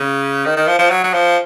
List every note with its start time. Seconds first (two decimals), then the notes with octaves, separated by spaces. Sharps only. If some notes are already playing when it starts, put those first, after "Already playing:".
Already playing: C#3
0.46 D#3
0.56 D#3
0.68 F3
0.79 F3
0.90 F#3
1.04 F#3
1.13 F3